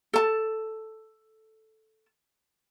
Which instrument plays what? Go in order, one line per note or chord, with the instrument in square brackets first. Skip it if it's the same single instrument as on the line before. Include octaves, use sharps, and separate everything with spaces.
[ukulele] A4 A5